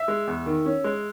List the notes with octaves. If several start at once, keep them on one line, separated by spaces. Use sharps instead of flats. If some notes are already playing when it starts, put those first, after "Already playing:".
Already playing: E5
G#3
E2
D#3
C#4
G#3